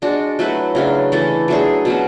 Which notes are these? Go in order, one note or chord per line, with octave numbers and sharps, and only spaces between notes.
G#3 D4 F#4
F#3 A3 E4 B4
C#3 F#3 A3 D4
E3 A3 E4 A4
F#3 A3 D4 G#4
B2 F#3 C#4